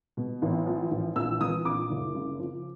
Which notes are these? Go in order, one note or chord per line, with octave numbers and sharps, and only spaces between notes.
B2
A1
F3
A1
A#1 E6
E3 D#6
A#1 D6
F#1
C#3
F3